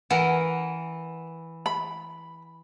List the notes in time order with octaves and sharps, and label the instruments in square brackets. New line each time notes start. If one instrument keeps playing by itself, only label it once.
[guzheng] E3 A#4 [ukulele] F#5
[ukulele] B5